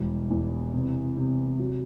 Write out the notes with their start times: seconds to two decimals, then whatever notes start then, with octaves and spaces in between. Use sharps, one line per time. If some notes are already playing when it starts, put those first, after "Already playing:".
Already playing: E1 G3 E4
0.30 E2
0.73 C3
1.17 C3
1.59 F#3